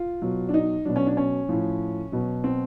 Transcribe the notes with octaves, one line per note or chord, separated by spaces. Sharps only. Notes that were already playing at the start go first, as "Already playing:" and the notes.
Already playing: F4
B2 F#3
D4
D#4
B2 F#3 D4
C#4
D4
C#4
A2 F3
B2 F#3
C4